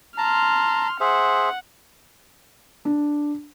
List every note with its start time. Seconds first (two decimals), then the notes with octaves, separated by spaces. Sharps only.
0.18 A5 A#5 C6 F6
1.00 G#4 C5 E5 F#5
2.85 D4